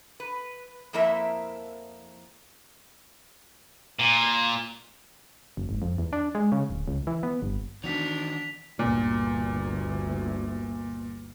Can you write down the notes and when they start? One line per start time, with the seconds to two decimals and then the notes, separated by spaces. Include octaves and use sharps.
0.20 B4
0.93 F2 F3 A#3 E4 A#4 E5
3.99 A#2
5.57 F#1
5.69 G#1
5.82 F2
5.98 E2
6.13 D4
6.35 G#3
6.52 C#3
6.70 D1
6.88 C#2
7.07 E3
7.23 B3
7.42 G1
7.84 D#3 E3 B3 D4 F#4 B6 F7
8.79 G1 D2 A#2